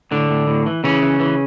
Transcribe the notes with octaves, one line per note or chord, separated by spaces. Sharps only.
A2 D3 D4
A2
A2
E3
C#3 E3 C#4
E3
E3